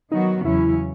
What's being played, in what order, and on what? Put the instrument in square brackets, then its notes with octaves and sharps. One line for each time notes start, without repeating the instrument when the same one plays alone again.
[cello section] D#3 F#3 B3 F#4 [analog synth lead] D#4
[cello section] E2 C#3 F#3 C#4 [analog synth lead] E4